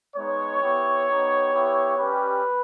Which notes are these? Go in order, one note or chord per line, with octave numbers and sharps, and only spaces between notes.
G#3 B3 D#4 C#5
B3 E4 G4
B3 D#4 G4
B3 E4 G4
G3 C#4 G4 B4